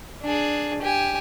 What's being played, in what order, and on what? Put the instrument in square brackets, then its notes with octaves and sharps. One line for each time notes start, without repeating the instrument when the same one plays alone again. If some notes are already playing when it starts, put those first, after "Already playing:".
[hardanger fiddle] D4 G#4
G4 G#5